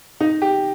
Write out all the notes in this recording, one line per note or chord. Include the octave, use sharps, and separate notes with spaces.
D#4
G4